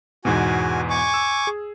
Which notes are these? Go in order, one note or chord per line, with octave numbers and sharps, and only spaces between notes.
E2 G#2 B2 F#4 G#5
G#5 C#6 D6
E6
G#4